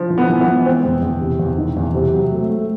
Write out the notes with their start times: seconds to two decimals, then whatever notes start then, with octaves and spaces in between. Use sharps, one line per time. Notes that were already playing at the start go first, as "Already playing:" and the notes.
Already playing: F3
0.10 E3
0.18 B3
0.29 E3
0.41 B3
0.47 E3
0.66 G#3 C4
0.85 E2
1.03 E2
1.21 C3
1.39 E2
1.58 D#3
1.77 E2
1.94 C3
2.13 F#3
2.32 A3
2.50 A3